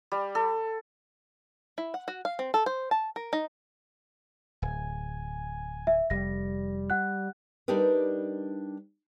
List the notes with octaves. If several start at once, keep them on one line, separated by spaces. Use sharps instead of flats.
G3
A4
E4
F#5
F#4
F5
C4
A4
C5
A5
A#4
D#4
D1 G#5
E5
F1 G3 A#6
F#5 F#6
G3 D4 D#4 G4 A#4 B4